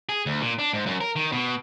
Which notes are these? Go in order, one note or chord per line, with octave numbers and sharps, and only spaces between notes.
G#4
D2
A#2
D4
G#2
F#2
A#4
D#3
B2